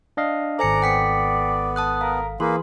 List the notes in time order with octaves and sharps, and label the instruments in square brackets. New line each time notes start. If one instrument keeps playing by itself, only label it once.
[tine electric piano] D4 D#5 F5
[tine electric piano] G#1 A4 [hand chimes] C5 G#5 C#7 [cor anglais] D5 [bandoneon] A#5
[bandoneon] B3 [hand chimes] G5 B6 C#7
[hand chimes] A5 D#6 F#6
[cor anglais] A#4 [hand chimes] F5
[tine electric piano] E3 G#4 [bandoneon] A#3 [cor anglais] B4 [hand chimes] C6